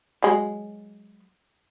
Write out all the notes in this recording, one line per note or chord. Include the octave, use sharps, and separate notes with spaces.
F#3 G#3